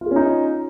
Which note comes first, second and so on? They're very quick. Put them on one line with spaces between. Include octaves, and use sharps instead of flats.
F4 G#4 C#4 D#4